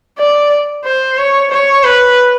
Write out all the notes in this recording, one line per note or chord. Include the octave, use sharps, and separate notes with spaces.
D5
C5
C#5
C#5
B4